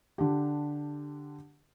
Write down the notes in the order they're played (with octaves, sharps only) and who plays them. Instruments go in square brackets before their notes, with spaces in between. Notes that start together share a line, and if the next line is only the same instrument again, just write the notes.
[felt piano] D3 D4 G4